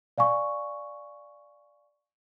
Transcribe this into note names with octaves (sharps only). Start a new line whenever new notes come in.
D5 F5 G#5 C#6